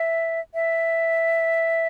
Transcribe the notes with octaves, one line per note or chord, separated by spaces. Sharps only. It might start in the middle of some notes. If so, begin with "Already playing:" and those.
Already playing: E5
E5